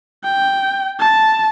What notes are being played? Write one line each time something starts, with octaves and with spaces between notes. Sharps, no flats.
G5
A5